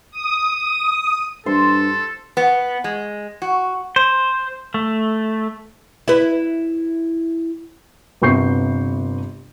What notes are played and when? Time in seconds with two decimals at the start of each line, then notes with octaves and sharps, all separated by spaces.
0.11 D#6
1.46 G2 A4 C5
2.37 B3
2.84 G#3
3.42 F#4
3.96 C5
4.74 A3
6.08 E4 B4
8.22 G1 C3 B3 C#6 G6 C7